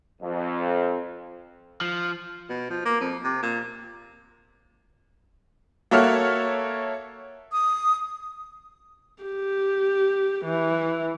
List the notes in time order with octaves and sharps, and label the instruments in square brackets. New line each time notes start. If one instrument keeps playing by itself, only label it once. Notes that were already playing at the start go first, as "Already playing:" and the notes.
[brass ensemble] F2
[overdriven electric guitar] F3
[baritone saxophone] B2
F3
A#3
F2
C3
A#2
[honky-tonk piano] A#3 F#4 A4 C#5 E5 F6
[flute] D#6
[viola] G4
E3